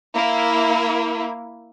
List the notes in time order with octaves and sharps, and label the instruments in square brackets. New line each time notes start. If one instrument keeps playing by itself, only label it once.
[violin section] A#3 E4